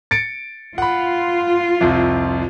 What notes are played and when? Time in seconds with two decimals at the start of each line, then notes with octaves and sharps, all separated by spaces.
0.11 A6 C#7 D7
0.78 F4 F#5 B5
1.81 C2 F2